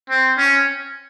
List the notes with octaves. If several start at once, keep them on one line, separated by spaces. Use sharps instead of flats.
C4
C#4